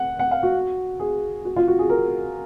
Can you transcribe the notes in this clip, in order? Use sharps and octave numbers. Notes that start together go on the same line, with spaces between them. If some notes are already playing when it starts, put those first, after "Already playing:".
Already playing: F#5
F#5
F5
F#4
G#4
F#4
F4
F#4
G#4
A#4